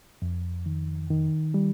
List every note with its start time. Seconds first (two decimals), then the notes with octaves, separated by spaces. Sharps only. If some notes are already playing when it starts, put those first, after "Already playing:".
0.22 F2
0.66 D#3
1.10 D#3
1.54 G3